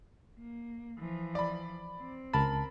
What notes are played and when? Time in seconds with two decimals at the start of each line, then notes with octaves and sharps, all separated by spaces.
0.39 A#3
0.98 E3 F3
1.35 D5 B5
2.00 C4
2.33 C#2 A#4 A5 B5